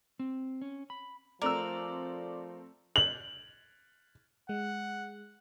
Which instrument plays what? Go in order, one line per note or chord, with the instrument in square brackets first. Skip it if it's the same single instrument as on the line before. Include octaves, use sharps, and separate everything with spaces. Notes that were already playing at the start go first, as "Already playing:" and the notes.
[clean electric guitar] C4
C#4
B5
[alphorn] F3 [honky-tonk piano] A3 C4 [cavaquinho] A#4 [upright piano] D5 E6
[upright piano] F#7
[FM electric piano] G#3 [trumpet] F#5